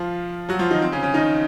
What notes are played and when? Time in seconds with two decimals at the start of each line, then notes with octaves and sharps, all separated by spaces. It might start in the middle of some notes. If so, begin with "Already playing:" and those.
Already playing: F3 F4
0.49 F#3 F#4
0.59 F3 F4
0.71 D#3 D#4
0.82 C4
0.92 C#3 C#4
1.03 C#3 C#4
1.14 D#3 D#4